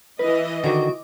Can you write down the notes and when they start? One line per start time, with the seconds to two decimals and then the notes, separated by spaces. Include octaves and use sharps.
0.19 E3 B4 D#5
0.64 D3 D#3 F#4 D6